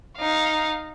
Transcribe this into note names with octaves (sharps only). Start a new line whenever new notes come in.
D#4 F5